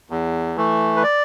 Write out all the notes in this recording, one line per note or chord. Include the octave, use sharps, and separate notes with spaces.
E2
E3 A3
B4
D5